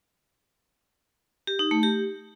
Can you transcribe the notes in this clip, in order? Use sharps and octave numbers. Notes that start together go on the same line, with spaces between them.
G4
D#4
A3
G4